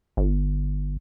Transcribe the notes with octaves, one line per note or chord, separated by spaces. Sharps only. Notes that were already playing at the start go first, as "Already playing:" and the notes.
G1